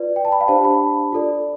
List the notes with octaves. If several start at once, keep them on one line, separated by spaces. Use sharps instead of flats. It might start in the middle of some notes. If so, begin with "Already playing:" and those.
Already playing: F4 B4 D5
G5
A5
B5
F5
D4 G4 C5 A5
B5
F4 A4 D5